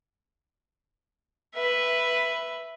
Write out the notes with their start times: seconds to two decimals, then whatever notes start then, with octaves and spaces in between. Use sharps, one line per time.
1.55 B4 E5